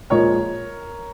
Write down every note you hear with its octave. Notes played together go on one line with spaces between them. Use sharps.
A#2 F3 G#3 A#4 C#5